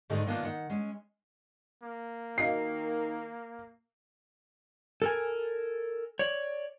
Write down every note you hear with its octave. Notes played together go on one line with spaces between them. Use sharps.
G#2 D3 D#3 G#3 A3 D#4
D#3 A#3 B3 D4 F4
D#3 F#5
G#3 C#4
A#3
D#3 F#4 D#5 F5 C7
A4 A#4 G#5
C#5 D5